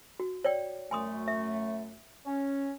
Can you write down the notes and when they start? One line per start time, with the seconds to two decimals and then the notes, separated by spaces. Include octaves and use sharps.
0.20 F#4
0.44 C#5 D5 G5
0.91 F#2 A3 G#5 C6 D#6
1.28 E5
2.26 C#4